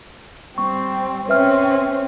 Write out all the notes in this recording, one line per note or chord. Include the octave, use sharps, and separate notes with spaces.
G3 C4 C#6
C4 C#4 B4 E5 F6